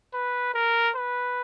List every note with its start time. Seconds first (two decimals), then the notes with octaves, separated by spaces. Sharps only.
0.14 B4
0.54 A#4
0.96 B4